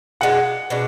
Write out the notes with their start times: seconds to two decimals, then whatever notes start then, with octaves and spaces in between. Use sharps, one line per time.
0.21 B2 G#3 D4 F4 F#5
0.70 B2 G#3 D4